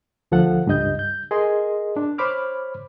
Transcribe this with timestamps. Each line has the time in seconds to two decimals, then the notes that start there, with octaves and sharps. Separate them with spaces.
0.32 D2 F3 A4 F#5
0.66 C#2 G2 G3 D#5 G6
0.99 G6
1.31 G#4 A#4 D#5 C6
1.97 D4
2.18 C5 C#5 B5 D6 F6